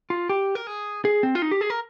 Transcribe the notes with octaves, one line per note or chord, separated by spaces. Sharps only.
F4
G4
A#4
G#4
G#4
C4
F4
D#4
G4
G#4
A#4